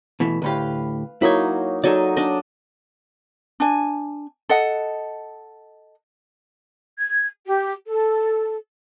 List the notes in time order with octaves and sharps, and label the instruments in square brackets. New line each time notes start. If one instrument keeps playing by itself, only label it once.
[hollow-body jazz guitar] B2 E3 A3
[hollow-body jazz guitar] D2 A2 G4 [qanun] B4 F5
[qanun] F#3 A#3 D#4 [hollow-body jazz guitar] E4 C#5
[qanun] F#3 D#4 G#5 [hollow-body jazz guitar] A4 C#5 D5
[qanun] D4 D#5
[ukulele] D4 G#5
A4 D#5 F#5
[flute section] G#6
G4
A4